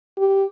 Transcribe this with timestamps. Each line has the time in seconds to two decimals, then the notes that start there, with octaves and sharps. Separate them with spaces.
0.18 G4